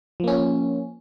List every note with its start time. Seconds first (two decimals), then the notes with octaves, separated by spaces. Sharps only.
0.20 F3
0.24 A#3
0.28 C#4